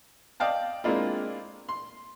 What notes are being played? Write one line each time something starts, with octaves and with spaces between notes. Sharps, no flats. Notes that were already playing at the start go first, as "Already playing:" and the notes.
D5 D#5 F5 G5 A5
G#3 A#3 C4 D4 E4 F4
C6